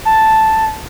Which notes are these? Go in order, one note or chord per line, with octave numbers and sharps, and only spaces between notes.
A5